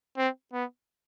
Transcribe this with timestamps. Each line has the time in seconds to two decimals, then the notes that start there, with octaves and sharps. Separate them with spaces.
0.17 C4
0.53 B3